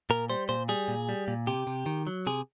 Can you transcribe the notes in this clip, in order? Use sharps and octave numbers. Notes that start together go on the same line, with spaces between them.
A#2 A#4
G3 C5
A#2 C5
G3 G#4
A#2
G3
A#2
C3 G4
C3
D#3
F#3
C3 G#4